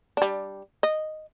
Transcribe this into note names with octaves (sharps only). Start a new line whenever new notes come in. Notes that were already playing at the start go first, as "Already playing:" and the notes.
G3 D4
D#5